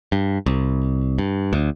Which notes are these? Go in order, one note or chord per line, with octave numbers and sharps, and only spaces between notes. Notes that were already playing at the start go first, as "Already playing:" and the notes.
G2
C2
G2
D2